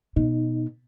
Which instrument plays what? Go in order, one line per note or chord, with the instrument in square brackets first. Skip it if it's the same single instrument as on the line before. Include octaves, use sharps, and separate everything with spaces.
[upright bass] B2 [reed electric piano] D#4